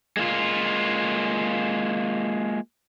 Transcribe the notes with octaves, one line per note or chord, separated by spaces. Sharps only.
G#3 A#3 E4 F4